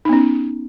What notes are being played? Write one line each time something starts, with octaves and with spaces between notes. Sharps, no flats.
B3 C#4 D#4